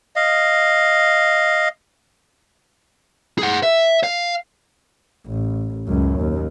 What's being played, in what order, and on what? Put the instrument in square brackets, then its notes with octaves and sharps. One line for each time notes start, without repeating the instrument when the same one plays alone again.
[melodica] D#5 F5
[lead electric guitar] G#4 F#5
E5
F5
[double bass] A1
C#2 F#2
D#2